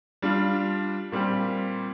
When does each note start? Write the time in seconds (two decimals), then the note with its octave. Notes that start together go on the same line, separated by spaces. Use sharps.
0.22 G3 D4 F4
1.12 A#2 G3 C4 G4